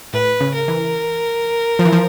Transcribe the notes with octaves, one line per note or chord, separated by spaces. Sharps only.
A2 B4
C#3
A#4
E3
F3
E3
F3